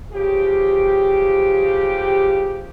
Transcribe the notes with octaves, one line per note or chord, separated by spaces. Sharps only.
C#3 F3 G4